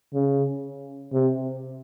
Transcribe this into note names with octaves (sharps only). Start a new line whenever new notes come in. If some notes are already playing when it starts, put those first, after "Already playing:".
C#3
C3